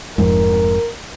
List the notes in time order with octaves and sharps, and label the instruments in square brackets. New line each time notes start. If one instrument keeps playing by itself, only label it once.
[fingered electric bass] F1 F2 G#2 [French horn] A#4